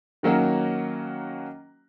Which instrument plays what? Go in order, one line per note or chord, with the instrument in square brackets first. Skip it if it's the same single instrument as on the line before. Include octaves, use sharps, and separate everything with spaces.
[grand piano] D#3 F#3 A#3 C#4 F#4